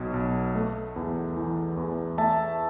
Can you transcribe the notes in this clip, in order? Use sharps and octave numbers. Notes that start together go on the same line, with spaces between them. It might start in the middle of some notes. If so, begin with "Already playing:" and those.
Already playing: B1 B2
B1
A3
E2
E3
E2
A3 E5 A5